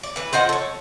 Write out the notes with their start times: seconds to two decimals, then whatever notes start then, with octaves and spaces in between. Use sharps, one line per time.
0.03 D5
0.16 E3 B4
0.33 F4 C5 D#5 F#5
0.49 A4 C#5